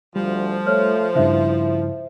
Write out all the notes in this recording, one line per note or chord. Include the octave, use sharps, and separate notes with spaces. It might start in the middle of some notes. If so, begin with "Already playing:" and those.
D2 F3 G3
A3 C#5 F6
G2 C#3 E4 C5 E5